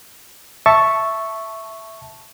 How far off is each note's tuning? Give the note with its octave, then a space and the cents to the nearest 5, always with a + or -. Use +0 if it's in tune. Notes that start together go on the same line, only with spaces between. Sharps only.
E5 +0 A5 +0 C#6 -5